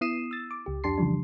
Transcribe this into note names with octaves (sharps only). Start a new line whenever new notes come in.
B3 E4 D#6 C7 D#7 E7
E6 A6
D6
C#2 G4
F2 D4 G4 A5 C6 C7
C#3 E3 F3 G3 D4